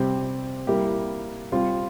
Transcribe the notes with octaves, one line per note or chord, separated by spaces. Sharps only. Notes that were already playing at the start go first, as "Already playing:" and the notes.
Already playing: C3 G3 C4 G4
G3 A#3 E4 G4
G3 C4 F4